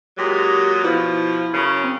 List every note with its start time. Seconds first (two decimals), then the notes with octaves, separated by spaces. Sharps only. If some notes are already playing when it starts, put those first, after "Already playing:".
0.18 A#2 F#3 G#3 G4
0.84 B2 F3 E4
1.54 F#2 C#3
1.84 C4